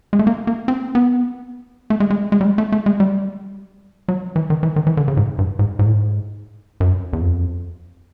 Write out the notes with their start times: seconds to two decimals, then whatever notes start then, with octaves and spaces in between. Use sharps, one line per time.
0.13 G#3
0.19 A3
0.27 A#3
0.47 A#3
0.68 C4
0.95 B3
1.90 A3
2.00 G#3
2.10 G#3
2.32 G#3
2.41 G3
2.45 G#3
2.58 A3
2.72 A3
2.86 G#3
3.00 G3
4.08 F#3
4.36 E3
4.50 D#3
4.63 E3
4.76 D#3
4.87 E3
4.97 D3
5.08 C#3
5.17 G#2
5.39 G2
5.59 G#2
5.79 G#2
5.86 A2
5.93 G#2
6.80 F#2
7.13 E2
7.21 F2